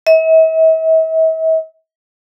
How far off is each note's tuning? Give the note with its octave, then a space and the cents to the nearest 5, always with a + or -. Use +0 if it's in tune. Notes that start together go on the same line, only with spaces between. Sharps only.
E5 -45